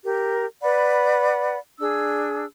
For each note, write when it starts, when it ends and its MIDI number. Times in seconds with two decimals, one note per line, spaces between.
0.04 0.46 67
0.04 0.46 70
0.63 1.58 71
0.63 1.58 74
0.63 1.58 78
0.63 1.58 83
1.79 2.45 62
1.79 2.45 68
1.79 2.45 88